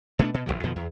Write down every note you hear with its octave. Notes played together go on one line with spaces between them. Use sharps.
B2 A3 B3 D4
B2
F#1 E2 E3 F#3
F2 B2 D#3 F3
E2